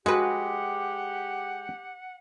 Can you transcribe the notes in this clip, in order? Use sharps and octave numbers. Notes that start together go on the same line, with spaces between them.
G#3 F#4 G4 B4 F#5